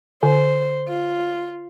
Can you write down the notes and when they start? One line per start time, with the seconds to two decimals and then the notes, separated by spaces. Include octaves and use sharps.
0.23 D3 C5
0.88 F4